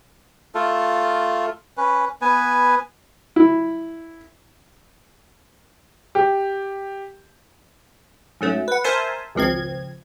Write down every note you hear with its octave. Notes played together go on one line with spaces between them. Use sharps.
A3 F4 A4
C#4 B4
B3 B4 G#5
E4
G4
G#2 F#3 A3 C#4
B4 F#5
A#4 C5 E5 G#5 A5 C6
G#1 C#2 F3 C4 G#6